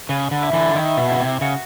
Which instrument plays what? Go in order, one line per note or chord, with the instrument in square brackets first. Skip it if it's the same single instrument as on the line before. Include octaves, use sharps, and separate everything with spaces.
[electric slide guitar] C#3 [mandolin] B4
[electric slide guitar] D3
[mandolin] E4
[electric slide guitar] D3 E3
[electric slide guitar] D#3 [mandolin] E4
[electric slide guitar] B2
[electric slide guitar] C#3 [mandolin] E4
[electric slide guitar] C3
[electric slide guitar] C#3 [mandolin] F#4